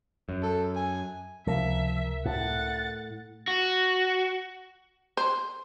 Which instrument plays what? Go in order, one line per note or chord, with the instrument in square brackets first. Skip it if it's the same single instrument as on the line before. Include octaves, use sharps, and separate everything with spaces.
[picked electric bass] F#2
[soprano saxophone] A4
G#5
[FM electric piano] C#2 C3 A#4 [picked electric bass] F3 [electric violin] E5
[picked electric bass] A2 [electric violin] F#5 A6
[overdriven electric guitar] F#4
[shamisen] C5